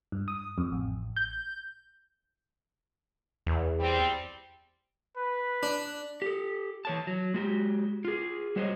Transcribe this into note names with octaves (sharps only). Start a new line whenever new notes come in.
G2
D#6
F2
A1
G6
E2
G3 C4
B4
D4
G4 A4
E3 C#5 A5
F#3
G#3 F#4 G4
F4 G#4
G3 F#4 C5 C#5 D#5